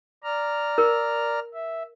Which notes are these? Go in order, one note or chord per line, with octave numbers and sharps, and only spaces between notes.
D5 A#5 F6
A#4
E5